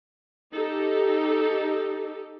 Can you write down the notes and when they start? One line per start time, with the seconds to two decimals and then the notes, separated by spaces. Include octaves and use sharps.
0.54 D#4 G4 A4